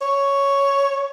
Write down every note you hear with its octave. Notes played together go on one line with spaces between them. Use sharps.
C#5